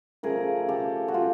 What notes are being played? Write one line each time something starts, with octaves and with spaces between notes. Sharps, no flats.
C#3 F3 A3 G#4 A#4
G4 A4
F#4
F4 G4